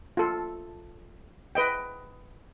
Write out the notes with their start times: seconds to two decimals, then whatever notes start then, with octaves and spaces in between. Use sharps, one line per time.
0.17 F4 A4
1.55 B4 D#5 G5